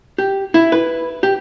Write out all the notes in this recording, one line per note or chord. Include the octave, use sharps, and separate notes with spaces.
G4
E4
B4
G4